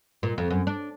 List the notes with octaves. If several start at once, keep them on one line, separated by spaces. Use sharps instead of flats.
A#2
F2
F#2
D4